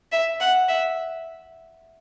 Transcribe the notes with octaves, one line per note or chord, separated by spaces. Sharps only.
E5
F#5
E5